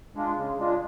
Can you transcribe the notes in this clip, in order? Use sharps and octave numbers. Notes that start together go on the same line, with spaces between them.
G#3 D4 F4
C#3
G#3 D4 F4